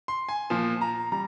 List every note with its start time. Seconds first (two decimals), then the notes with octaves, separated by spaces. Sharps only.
0.08 C6
0.29 G#5
0.50 A#2 F3
0.81 A#5
1.12 G3 A#5